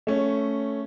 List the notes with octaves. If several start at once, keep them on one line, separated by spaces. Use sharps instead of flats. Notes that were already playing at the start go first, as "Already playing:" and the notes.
A3 C#4